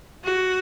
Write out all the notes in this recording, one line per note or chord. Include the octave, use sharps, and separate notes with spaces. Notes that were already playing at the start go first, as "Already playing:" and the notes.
F#4